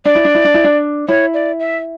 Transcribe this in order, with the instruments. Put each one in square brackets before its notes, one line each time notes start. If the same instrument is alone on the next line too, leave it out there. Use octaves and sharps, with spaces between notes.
[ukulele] D4 [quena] D5
[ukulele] E4
D4
E4
D4
E4
D4
[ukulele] E4 [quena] C#5
[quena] D5
E5